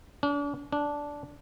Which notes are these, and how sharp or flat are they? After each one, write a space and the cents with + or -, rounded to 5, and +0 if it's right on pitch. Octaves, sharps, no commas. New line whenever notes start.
D4 -40
D4 -10